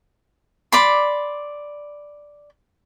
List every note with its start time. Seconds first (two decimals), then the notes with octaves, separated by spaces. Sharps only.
0.72 D5 B5 C6